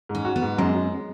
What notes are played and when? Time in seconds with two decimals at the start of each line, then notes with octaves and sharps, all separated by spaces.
0.09 G#2
0.15 C#4
0.25 F#4
0.36 B3
0.42 G#2
0.58 F#2 G#3
0.74 F#2